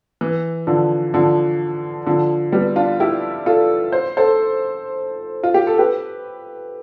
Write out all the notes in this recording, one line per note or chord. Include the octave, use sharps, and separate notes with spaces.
E3
D3 F3
D3 F3
D3 F3
G3 B3
D4 F4
E4 G4
F4 A4
C5
A4 C5
F4
G4
A4
G4 B4